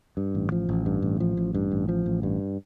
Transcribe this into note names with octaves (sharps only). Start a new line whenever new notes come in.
G2
A1
F3
A1
G2
A1
F3
A1
G2
A1
F3
A1
G2